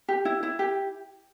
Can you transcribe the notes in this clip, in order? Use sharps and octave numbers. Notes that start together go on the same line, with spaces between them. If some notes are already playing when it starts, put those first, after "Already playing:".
G4
E4
E4
G4